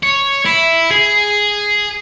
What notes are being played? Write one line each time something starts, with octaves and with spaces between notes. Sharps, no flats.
C#5
E4
G#4